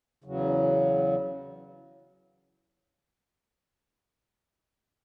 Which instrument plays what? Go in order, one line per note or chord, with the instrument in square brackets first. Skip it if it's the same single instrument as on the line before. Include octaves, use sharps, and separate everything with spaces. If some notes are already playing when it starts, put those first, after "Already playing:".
[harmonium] E2 C#3 F#3